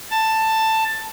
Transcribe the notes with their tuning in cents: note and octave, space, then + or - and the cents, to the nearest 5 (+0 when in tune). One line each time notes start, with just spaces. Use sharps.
A5 +10